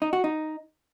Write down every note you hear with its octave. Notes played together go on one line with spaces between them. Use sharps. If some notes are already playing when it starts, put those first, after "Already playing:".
D#4
F#4
D#4